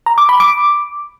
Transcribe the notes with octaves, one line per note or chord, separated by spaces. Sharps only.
A#5
D6
B5
D6